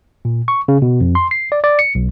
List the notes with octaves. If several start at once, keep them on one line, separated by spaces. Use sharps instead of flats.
A#2
C#6
C#3
B2
F2
C6
C7
D5
D5
C#7
B1